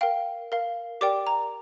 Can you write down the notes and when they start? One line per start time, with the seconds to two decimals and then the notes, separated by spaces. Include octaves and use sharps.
0.01 A#4 F5 G5
0.52 A#4 F5
1.01 G4 A#4 D5 G5 D6
1.27 A#5